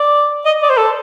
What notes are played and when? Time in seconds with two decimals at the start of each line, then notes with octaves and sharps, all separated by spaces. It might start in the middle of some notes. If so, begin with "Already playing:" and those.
Already playing: D5
0.45 D#5
0.62 D5
0.69 C5
0.77 A4